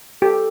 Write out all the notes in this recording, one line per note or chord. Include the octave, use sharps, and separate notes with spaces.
G4 A4